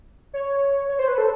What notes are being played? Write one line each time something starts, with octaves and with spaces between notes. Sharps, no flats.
C#5
C#5
C5
B4
A4